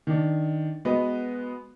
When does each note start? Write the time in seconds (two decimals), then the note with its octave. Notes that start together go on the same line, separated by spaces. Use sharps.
0.07 D#3 D4
0.85 G#3 B3 F#4 B4 D#5